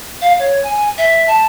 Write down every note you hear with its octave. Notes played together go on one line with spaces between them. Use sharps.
F5
C#5
G#5
E5
A5